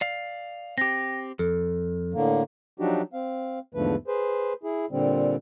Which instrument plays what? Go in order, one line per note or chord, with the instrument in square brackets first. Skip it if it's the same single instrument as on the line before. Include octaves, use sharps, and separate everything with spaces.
[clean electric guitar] D5 F5
[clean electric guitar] C4 G4 [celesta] A#6
[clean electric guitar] F2 [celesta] A4
[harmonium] A2 D3 A#3
F3 F#3 D4 D#4 F#4 G4
C4 F5
E2 G#2 D3 F3 A3 B4
G#4 B4 C5
E4 G#4
A#2 D3 G3 C4